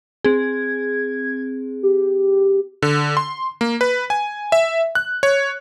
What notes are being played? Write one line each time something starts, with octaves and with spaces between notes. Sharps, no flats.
C4 G#4 G#6
G4
D3
C6
A#3
B4
G#5
E5
F#6
C#5